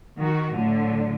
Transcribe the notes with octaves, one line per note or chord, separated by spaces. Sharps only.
D#3 F#4
A2 D3 F#3